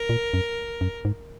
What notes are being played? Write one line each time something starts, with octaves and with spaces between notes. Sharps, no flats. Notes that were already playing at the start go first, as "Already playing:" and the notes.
Already playing: A#4
A#2
F#2
F#2
G#2